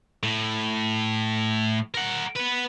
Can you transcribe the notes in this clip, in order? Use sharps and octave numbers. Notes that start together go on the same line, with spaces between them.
A2
A#4 F#5
B3 B4